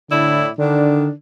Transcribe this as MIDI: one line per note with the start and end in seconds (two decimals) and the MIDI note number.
0.10 0.48 45
0.10 0.42 50
0.10 0.48 64
0.10 0.48 74
0.58 1.09 50
0.58 1.10 51
0.58 1.10 62